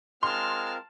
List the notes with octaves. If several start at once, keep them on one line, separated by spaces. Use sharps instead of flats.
G#3 C4 F4 A#4 A5 C6 F6